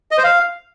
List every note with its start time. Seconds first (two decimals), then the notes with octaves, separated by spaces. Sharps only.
0.11 D#5
0.18 C5
0.24 F5